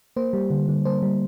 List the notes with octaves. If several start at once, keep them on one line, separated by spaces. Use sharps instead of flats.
A#3 C5
G3
D3
D3
A#3 C5
G3